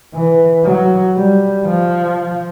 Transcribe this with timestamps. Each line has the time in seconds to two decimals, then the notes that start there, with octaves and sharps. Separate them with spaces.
0.14 E3
0.65 F#3
1.16 G3
1.66 F3